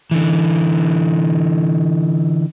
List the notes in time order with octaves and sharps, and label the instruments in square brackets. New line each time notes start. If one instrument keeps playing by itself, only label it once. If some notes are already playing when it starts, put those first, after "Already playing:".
[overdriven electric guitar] D3 E3